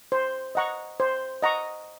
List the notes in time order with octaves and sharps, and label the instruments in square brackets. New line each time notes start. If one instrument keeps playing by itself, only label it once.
[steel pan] C5
D#5 F#5 A#5 C#6
C5
D#5 F#5 A#5 C#6